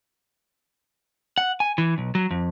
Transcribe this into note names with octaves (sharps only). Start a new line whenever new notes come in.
F#5
G#5
E3
B1
F#3
F2